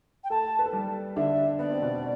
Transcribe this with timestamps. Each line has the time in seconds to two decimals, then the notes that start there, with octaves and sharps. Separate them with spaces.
0.24 G5
0.30 A3 A4 A5
0.59 B4
0.66 A4
0.73 G3 G4
1.16 D3 D4 E5
1.59 B3 D5
1.71 C4
1.82 B2 B3